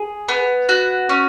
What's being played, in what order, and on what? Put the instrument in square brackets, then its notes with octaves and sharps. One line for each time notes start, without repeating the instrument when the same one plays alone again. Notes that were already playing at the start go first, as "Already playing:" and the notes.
Already playing: [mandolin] G#4
B3
F#4
C#4